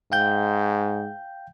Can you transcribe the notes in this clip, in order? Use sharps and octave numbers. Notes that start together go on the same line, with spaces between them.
G#2 F5 G5 G6